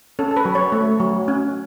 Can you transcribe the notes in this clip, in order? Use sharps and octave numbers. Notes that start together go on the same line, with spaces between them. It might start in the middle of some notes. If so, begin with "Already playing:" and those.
C#4 A4
A4
B4
F#3
C#5
A3
F#3
C#4